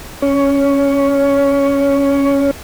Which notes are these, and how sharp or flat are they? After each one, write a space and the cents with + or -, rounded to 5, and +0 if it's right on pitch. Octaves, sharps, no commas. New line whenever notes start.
C#4 +0 C#5 +15